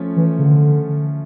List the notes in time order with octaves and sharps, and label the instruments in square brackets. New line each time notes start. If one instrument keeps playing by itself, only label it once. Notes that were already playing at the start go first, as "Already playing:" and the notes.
Already playing: [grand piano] F3 A3 C#4
[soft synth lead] E3
C#3
D3